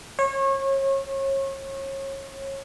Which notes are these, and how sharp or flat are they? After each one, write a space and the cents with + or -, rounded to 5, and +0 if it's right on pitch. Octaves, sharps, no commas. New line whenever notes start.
C#5 -30